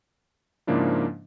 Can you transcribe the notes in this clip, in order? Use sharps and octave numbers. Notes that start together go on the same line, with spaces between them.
G#2 C#3 F3 A#3 D4 E4